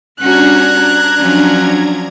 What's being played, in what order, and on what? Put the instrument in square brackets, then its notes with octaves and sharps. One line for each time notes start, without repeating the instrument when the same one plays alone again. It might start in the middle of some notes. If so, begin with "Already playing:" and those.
[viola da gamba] G3 C#4 F#4 [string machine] D4 A#5 G#6 [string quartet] F#6
[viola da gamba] F3 F#3 C#4